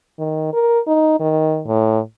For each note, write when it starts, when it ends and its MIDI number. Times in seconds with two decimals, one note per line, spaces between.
0.19 0.49 51
0.53 0.80 70
0.87 1.15 63
1.20 1.62 51
1.67 1.99 45